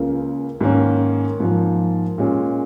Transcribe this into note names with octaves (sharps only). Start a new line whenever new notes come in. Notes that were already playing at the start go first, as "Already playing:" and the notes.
Already playing: C#2 C#3 A#3
G#2 D#3 A#3 C#4
G#2 F3 A#3
A#2 G#3 C#4